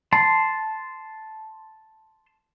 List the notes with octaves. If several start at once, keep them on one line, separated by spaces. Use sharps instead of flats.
A5 C6